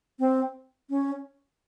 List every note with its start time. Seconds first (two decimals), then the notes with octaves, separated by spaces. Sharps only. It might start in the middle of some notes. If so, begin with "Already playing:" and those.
0.19 C4
0.90 C#4